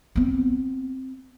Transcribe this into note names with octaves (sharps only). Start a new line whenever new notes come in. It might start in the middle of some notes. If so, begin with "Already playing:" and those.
B3 C4